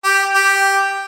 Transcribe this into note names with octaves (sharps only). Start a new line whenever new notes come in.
G4
G4